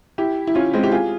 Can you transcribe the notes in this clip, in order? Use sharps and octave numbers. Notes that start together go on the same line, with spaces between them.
E4 G4
E4
C#4 F4
G#3 C4
E4 G4
F4 G#4